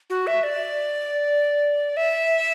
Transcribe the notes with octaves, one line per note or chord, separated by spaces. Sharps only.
F#4
E5
D5
E5